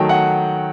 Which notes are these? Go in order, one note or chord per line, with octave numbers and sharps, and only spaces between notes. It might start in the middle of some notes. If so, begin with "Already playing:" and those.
Already playing: D#3 F#3 A3 G5 A5
F#5